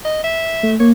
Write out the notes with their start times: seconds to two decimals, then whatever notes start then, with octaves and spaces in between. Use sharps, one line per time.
0.05 D#5
0.24 E5
0.63 A3
0.80 A#3 C#5